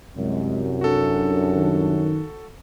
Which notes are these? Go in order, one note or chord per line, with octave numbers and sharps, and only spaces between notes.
C2 F#2 C3 G#3
D4 F#4 A4
D#3